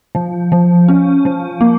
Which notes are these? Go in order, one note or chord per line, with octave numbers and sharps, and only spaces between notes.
F3
F3
C#4
F3
A#3